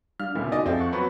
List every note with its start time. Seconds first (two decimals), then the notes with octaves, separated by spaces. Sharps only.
0.20 G3 D4 F5 F6
0.36 D2 A#2 C#3 B3 E4
0.52 D#4 F#4 D5 D#5 G#5
0.66 F2 F3 A3 C4 G#4
0.80 F#5 C#6
0.92 F#3 B3 C4